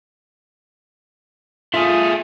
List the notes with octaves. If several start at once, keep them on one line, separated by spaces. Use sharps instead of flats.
A3 F4 G#4